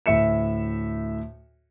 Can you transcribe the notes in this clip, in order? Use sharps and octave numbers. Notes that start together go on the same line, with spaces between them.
D2 A2 E5 C#7 E7